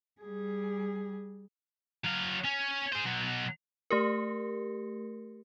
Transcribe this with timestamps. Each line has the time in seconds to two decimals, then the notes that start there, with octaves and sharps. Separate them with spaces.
0.21 G3 G#4
2.05 F#3 F5
2.45 C#4
2.93 G#4 C5
3.05 B2 F#3
3.91 A3 G4 A#4